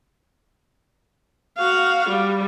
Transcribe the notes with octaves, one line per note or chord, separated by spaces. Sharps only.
F#4 F5
G3